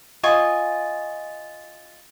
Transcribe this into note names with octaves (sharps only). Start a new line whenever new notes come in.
F4 D#5 G#5 C#6